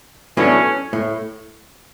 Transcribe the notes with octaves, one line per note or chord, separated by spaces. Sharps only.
A2 F#3 B3 C#4 D4
A2